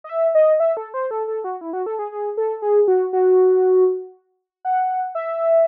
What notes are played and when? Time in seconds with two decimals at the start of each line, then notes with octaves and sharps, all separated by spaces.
0.04 D#5
0.09 E5
0.35 D#5
0.60 E5
0.77 A4
0.94 C5
1.11 A4
1.28 A4
1.44 F#4
1.61 E4
1.73 F#4
1.86 A4
1.99 G#4
2.12 G#4
2.37 A4
2.62 G#4
2.88 F#4
3.13 F#4
4.65 F#5
5.15 E5